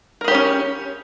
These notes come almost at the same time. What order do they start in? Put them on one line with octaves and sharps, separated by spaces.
A#4 G#4 G4 C#5 C#4